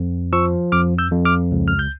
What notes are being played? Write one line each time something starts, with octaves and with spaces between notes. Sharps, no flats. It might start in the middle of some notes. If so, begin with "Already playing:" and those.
Already playing: F2
F3 C#6 E6
F2 D6 F6
E6 G6
F2
D6 F6
C#2
F6
G6